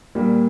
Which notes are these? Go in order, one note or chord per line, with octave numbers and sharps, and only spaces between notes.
A#2 G3 A#3